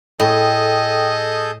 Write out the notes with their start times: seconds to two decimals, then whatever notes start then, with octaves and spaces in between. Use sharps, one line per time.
0.20 A2 G#4 A4 D#5 G5 G6